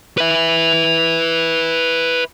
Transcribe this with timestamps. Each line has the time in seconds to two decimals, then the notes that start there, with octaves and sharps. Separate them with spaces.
0.18 B4 E5